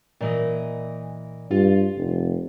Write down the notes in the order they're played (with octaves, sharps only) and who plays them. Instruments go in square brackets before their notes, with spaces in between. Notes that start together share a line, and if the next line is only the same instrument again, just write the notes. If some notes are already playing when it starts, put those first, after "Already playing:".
[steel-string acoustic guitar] A#2 E3 D#5
[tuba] G2 [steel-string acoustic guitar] F4
[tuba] F1